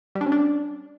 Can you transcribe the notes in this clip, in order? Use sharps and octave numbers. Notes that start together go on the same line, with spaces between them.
G3
D4
C#4
D4